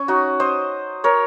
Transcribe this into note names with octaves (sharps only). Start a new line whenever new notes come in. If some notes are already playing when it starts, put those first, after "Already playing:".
Already playing: C#4
D#4 F#4
C5 D#5
A#4 C#5